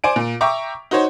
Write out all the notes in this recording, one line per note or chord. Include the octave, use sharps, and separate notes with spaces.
C5 D5 G#5 D7
A#2
E5 G5 A#5 C#6 D6
D#4 F#4 C5 C#5